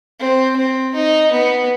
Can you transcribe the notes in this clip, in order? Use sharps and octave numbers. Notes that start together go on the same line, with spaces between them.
C4
C4
D#4
B3